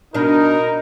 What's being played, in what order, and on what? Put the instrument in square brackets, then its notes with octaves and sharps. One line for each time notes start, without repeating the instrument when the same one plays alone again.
[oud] B2 D4 [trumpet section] D#4 A#4